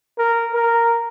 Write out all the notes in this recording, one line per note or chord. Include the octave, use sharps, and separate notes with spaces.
A#4
A#4